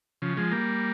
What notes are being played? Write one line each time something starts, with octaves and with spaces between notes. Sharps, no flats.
C#3 F3
F3 G#3
G3 A#3